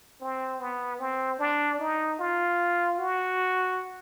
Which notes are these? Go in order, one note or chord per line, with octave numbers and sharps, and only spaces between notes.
C4
B3
C4
D4
D#4
F4
F#4